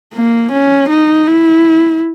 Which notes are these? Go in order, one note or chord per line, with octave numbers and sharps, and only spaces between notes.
A#3
C#4
D#4
E4